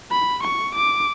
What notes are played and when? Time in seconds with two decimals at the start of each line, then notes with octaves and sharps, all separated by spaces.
0.11 B5
0.43 C#6
0.75 D6